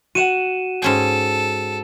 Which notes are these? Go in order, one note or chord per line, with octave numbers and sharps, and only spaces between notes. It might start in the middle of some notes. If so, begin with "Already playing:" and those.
F#4 F#5 D#7 E7
G#2 C#4 A4 G5